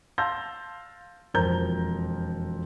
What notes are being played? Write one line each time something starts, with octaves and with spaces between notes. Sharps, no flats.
F5 A5 C6 E6 G6 A#6
E1 F2 A#4 C5 A#5 G6